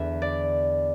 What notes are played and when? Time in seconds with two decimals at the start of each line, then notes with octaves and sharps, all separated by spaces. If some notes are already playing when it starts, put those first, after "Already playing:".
Already playing: E2 D3 E5
0.22 D5